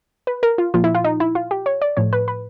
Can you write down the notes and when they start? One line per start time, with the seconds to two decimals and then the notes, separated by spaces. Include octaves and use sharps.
0.27 B4
0.43 A#4
0.58 F4
0.74 A#2 F3 F4
0.84 E4
0.95 F4
1.04 D#4
1.20 E4
1.35 F4
1.51 G4
1.66 C#5
1.82 D5
1.97 A2 F3 C#5
2.13 B4
2.28 B4